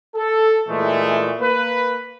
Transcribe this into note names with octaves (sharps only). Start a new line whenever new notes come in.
A4
A#2 E3 G#3 A3
A#3 B4